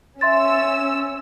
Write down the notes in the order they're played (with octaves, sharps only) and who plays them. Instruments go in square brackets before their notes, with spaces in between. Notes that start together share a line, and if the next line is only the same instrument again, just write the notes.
[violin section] C#4 E6 [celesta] E5 C6 A6